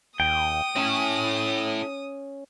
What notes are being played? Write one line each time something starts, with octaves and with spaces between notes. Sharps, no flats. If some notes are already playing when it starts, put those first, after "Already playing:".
D#2 G5 D#6
C#4 E4 A4